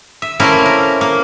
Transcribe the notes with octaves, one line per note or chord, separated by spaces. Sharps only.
E5
A3 A#3 C4 C#4 E4 A#4
A#4
A#3